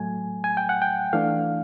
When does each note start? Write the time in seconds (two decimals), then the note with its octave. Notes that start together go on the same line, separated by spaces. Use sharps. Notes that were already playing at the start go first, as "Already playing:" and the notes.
Already playing: A2 F#3 A3 G#5
0.44 G#5
0.57 G5
0.69 F#5
0.82 G5
1.13 E3 A3 D4 F5